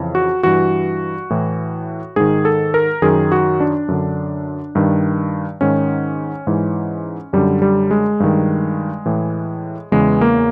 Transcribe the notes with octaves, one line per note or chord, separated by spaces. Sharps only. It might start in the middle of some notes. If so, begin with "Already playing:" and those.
Already playing: F2 C#3 E3
F#4
G2 E3 F#4
A2 E3
G#2 D#3 G#4
A4
A#4
F#2 D#3 G#4
F#4
D4
F#2 D3
G2 D#3
G#2 D#3 C#4
G#2 E3
F#2 D3 G3
G3
G#3
G2 D#3
A2 E3
E2 C#3 E3 G#3
A#3